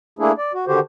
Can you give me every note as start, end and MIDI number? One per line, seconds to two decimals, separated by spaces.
0.19 0.32 57
0.19 0.32 58
0.19 0.32 62
0.19 0.32 64
0.19 0.32 68
0.38 0.52 74
0.54 0.65 66
0.67 0.80 50
0.67 0.80 51
0.67 0.80 66
0.67 0.80 67
0.67 0.80 72